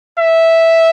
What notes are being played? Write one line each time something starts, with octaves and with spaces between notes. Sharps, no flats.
E5